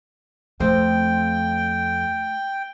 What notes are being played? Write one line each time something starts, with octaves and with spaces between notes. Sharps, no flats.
F2 A3 C4 G5